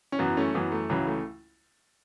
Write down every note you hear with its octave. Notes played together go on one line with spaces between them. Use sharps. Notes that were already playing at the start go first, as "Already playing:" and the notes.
C#4
F#2 E3 F#3 B3
A3 C#4
F#2 E3 F#3 B3
A3
C#2 C#3 E3 F#3
A3